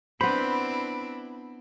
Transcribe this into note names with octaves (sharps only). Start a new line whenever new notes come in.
B3 C4 D4 E4 C5 B5